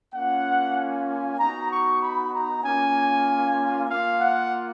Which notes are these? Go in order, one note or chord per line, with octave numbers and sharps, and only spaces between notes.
A#3 C#4 F4 F#5
G#5
B3 D#4 F#4 A#5
C#6
B5
A#5
A#3 C#4 F4 G#5
A#3 F4 F5
F#5